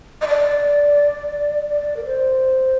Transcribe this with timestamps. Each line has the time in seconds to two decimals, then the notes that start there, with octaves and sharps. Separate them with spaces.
0.22 D#5
0.28 D5
1.70 D5
1.97 A#4
2.05 C5